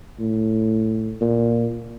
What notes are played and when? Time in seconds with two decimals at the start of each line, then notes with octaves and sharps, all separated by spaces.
0.19 A2
1.21 A#2